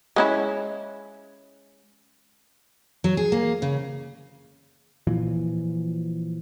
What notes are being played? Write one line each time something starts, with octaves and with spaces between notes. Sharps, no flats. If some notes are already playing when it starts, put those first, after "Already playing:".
G#3 C#4 E4
F#3
G#4
A#3
C#3
A#2 E3 F3